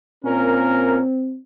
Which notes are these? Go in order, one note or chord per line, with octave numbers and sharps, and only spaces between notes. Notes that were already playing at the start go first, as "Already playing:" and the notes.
A#2 C4 C#4 A#4